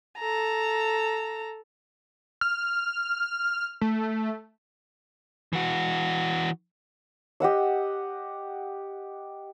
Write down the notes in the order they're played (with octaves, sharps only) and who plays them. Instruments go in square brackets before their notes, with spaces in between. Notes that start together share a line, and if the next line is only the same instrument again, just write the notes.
[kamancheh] A4 A#5
[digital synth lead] F6
A3
[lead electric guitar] E3 F#4
[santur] G4 D#5 F#5 E6